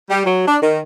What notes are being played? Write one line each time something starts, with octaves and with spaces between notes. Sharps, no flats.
G3
F#3
D4
D#3